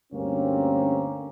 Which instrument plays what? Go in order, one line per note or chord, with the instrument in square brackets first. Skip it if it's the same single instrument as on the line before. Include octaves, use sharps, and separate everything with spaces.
[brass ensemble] D2 G2 A#3 C4 C#4